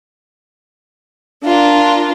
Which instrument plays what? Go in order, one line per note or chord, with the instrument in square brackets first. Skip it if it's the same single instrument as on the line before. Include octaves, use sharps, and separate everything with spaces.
[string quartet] D4 F4 A#4